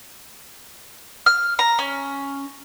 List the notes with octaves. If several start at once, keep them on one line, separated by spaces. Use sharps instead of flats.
F6
A#5
C#4